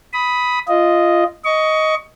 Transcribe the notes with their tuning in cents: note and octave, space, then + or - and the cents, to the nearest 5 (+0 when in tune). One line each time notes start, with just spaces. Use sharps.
B5 +0 D#6 +15
F4 -15 D#5 +0
D#5 +10 C#6 +20